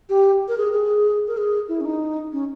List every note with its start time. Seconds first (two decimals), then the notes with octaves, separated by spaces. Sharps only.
0.09 G4
0.48 A#4
0.58 G#4
0.73 G#4
1.28 A#4
1.37 G#4
1.69 E4
1.81 C#4
1.85 D#4
2.33 C#4